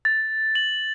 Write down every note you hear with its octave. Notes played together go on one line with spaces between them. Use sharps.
A6
F#7